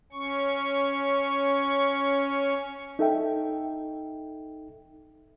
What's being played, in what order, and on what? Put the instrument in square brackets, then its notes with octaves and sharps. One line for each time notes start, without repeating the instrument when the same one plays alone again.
[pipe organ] C#4 C#6
[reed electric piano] D#4 A4 E5 G5